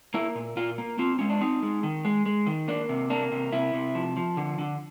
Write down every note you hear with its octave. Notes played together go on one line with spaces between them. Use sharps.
A#3 E4
A#2
A#2 F4
A#3
C4 F4
G#3 C#4
D4
C4 D#4
G#3
D#3
G#3
G#3
D#3
A#3 D4
C3
A#3 D4
C3
C3 E4
C3
F3
F3
D3
D3